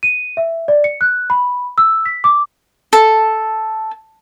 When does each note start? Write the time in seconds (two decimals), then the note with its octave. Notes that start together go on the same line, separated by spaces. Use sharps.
0.03 D#7
0.37 E5
0.68 D5
0.84 C#7
1.01 F#6
1.30 B5
1.78 E6
2.06 B6
2.24 D6
2.93 A4